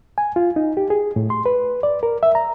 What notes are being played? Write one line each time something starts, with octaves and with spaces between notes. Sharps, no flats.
G#5
F4
D#4
G4
G#4
A2
C6
B4
D5
A#4
E5
A#5